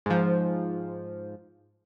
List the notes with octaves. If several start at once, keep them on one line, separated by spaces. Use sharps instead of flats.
G#2 F3